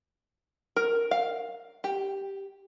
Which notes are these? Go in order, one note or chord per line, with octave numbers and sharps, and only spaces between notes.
A#4
F5
G4